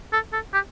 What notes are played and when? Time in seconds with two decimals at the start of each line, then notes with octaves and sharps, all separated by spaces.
0.13 A4
0.33 A4
0.53 G4